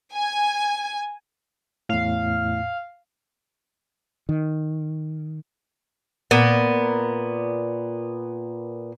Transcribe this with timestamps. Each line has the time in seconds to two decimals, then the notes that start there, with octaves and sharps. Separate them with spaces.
0.13 G#5
1.89 E2 A2 F5
4.29 D#3
6.31 A#2 B3